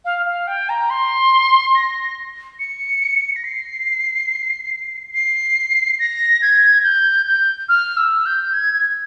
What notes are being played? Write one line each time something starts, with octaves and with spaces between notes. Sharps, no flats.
F5
F5
G5
A#5
C6
A#6
C#7
A#6
C7
C7
A#6
G#6
G6
G6
F6
E6
G6
G#6
G#6